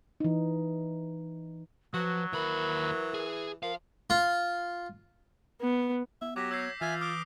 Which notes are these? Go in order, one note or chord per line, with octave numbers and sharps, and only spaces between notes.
E3 D#4
F3 F#3 F#4 B4
D#2 E3 A#4 B5
G#4
F3 A#4 F5
F4
B3
B3 E5
F#3 G4 D6 A#6 B6
C#5 E6 G6 C7
E3 F4 E5 G#5
D6 D#6 F6 G6